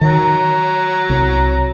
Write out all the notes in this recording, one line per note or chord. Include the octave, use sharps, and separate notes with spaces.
D#3 F#3 A#5
C2